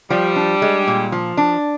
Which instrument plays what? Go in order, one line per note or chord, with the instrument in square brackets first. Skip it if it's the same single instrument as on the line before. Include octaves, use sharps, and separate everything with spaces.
[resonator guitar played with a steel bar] F3 [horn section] G3
[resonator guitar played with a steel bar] D4
G#3
A#2
F3
D4